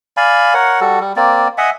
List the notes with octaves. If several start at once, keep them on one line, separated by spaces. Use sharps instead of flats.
D5 F5 G#5 B5
A#4 C#5 F#5
G3 F#4 A4
G3
A#3 C4 D5
D#5 E5 F#5 G#5